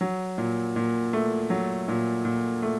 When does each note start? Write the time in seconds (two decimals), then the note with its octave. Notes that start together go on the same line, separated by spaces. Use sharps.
0.01 F#3
0.38 A#2
0.76 A#2
1.13 A3
1.50 F#3
1.88 A#2
2.25 A#2
2.62 A3